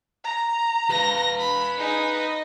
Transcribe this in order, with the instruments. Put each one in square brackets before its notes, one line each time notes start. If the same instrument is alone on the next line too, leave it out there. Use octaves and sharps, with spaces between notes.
[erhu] A#5
[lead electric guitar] B4 F5 [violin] A#6
[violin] B5
[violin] D#4 B5 [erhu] G#4
[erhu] D#5